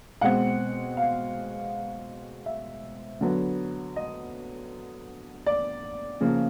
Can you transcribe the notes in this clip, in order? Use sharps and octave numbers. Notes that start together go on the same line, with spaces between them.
B2 G#3 C4 F#5
F5
E5
D3 F#3 B3
D#5
D5
C#3 F3 A#3